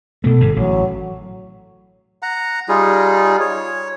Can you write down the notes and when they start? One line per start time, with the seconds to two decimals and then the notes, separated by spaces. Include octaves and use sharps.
0.24 B2 A3 A4
0.40 G1 G#2 C3
0.56 A1 F#3
2.23 F#5 A#5
2.69 G3 D#4 F4 G#4
3.40 C#5